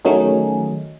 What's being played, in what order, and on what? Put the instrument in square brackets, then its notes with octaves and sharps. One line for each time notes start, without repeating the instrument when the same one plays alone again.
[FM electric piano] D#3 F#3 A3 C#4 D#4 G#4